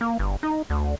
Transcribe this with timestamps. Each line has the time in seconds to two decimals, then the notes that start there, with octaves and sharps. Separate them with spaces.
0.01 A#3
0.19 G1
0.43 D#4
0.70 D2